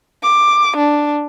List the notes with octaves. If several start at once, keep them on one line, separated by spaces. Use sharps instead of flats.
D6
D4